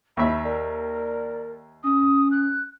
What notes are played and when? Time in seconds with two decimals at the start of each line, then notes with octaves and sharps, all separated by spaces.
0.17 D#2 E5 B5
0.44 A#4 D5
1.84 C#4 D#6
2.31 F#6